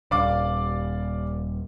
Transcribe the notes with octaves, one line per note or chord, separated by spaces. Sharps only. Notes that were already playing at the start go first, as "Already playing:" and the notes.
D#1 D5 F5 D6